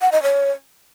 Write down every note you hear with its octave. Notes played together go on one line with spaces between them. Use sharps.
F#5
D#5
C#5